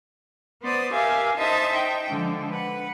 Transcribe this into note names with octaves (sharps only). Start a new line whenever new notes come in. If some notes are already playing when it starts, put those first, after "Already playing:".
B3 C5 D5 D#6
G4 A#4 E5 F5 G#5
D#4 C5 D#5 E5 A5
D#4 G5
D3 F3 G#3
B4 F#5